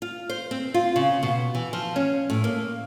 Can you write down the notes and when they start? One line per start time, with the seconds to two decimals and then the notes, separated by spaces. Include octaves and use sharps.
0.02 F4
0.30 C5
0.51 C4
0.74 F4
0.96 C#3
1.23 B2
1.55 E3
1.73 F3
1.96 C#4
2.30 A2
2.44 A#3